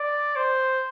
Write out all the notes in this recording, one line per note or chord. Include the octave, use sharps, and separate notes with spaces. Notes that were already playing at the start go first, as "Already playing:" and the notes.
Already playing: D5
C5